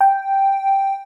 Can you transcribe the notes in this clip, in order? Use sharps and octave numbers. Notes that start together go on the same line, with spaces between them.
G5